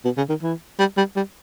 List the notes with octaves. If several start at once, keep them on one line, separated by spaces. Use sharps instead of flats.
B2
C#3
D#3
E3
G3
G3
G3